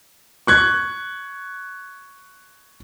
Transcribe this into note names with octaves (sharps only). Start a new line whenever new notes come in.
C#6 F#6 G#6